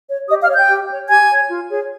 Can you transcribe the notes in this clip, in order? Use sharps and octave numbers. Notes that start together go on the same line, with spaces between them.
C#5
G4 D#5 D#6
F5 F6
C#5
G5 G6
G4
C#5
G4 G#5 G#6
C#5
F4
G#4 C#5